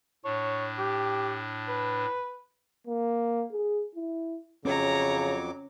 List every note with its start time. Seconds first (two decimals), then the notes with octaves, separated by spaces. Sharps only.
0.25 A2 D4 C#5
0.79 G4
1.68 B4
2.87 A#3
3.53 G#4
3.95 E4
4.65 F2 C#3 F#3 C#4 C#5 A#5 D6